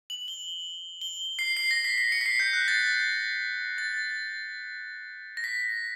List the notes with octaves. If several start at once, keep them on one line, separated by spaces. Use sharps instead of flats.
F#7
G7
G7
C7
C7
A#6
B6
C7
C#7
B6
C7
G6
F#6
A6
A6
A#6
B6